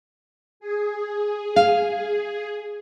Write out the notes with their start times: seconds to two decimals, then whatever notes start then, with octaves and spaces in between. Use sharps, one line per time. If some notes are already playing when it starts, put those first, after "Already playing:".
0.60 G#4
1.56 F5